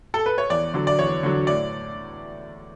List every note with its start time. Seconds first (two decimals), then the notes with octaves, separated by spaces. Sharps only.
0.14 A4
0.26 B4
0.38 C#5
0.50 E2 D5
0.74 D3 F#3
0.87 D5
0.99 E2 C#5
1.23 D3 F#3
1.47 A2 D5